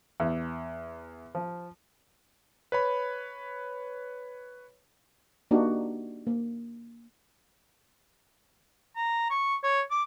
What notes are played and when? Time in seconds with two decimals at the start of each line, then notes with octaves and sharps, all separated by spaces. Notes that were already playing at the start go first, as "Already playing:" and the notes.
0.20 E2
1.35 F3
2.72 B4 C#5 B5
5.51 A#3 D4 D#4 F#4 G4
6.27 A#3
8.96 A#5
9.30 C#6
9.63 C#5
9.91 D6